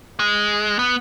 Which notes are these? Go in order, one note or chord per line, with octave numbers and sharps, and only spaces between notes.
G#3
B3